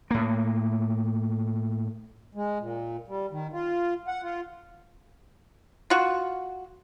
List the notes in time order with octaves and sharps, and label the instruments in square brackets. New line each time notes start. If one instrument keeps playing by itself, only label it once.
[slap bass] A2 A#3
[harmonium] G#3
A#2
G3
D#3
F4
F#5
F4
[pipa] F4 F#4